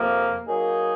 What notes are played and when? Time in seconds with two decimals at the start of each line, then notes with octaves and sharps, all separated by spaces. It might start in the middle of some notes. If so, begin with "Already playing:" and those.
Already playing: F2 C3 F3 A#3
0.46 F#3 A#3 D#4 G#4